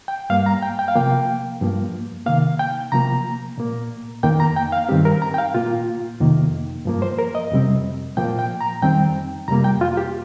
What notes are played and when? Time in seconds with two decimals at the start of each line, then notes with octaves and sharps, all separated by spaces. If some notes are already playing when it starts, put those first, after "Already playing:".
0.08 G5
0.30 G2 G3 A#3 F5
0.46 A#5
0.63 G5
0.79 G5
0.88 F5
0.96 C3 F3 A#3 G5
1.61 G2 F3 A#3
2.26 C3 D#3 A#3 F5
2.59 G5
2.92 C3 F3 A#3 A#5
3.58 A#2 A#3
4.23 F2 D#3 A#3 G5
4.40 A#5
4.56 G5
4.72 F5
4.89 G2 D#3 G3 C4 G4
5.05 A#4
5.22 A#5
5.34 G5
5.38 F5
5.54 A#2 A#3 F4
6.20 F2 C3 D#3 A#3
6.86 G2 F3 A#3
7.02 C5
7.19 A#4
7.35 D#5
7.51 F2 C3 G3 C4
8.17 A#2 F3 A#3 G5
8.39 G5
8.61 A#5
8.82 F2 D#3 G3 C4 G5
9.48 F2 C3 G3 A#3 A#5
9.64 G5
9.81 F4
9.97 G4